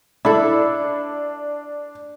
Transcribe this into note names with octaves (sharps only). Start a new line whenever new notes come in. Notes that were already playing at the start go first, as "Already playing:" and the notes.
D4 E4 A4 D5